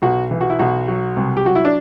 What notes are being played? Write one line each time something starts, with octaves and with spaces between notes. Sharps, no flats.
B1 F#4
E3
F#4
E4
B1 F#4
F#3
C2
G4
F#3 F#4
E4
D4